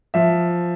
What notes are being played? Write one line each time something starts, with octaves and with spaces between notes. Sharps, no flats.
F3 E5